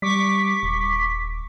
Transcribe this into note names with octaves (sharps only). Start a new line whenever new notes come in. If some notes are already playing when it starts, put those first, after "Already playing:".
G3 C#6 D6 B6
D#1